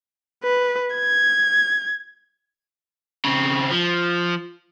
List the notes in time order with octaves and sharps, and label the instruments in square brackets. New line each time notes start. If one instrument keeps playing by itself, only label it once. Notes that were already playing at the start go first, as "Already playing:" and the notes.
[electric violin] B4
G#6
[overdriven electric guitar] C#3 C4
F3